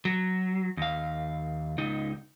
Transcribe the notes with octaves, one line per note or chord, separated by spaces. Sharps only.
F#3
D#2 F5
C#2 D#4